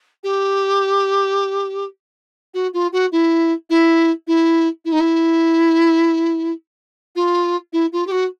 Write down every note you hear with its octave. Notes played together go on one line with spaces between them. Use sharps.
G4
F#4
F4
F#4
E4
E4
E4
E4
D#4
E4
F4
E4
F4
G4
F#4